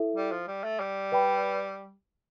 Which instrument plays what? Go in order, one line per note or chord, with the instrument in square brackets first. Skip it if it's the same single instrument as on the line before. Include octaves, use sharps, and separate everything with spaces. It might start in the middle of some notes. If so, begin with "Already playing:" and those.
Already playing: [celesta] E4 A4 E5
[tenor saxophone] G3
F3
G3
A3
G3
[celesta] B4 D5 G5 B5